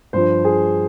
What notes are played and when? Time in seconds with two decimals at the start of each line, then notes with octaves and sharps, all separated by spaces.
0.13 G2 F3 C5
0.45 G#4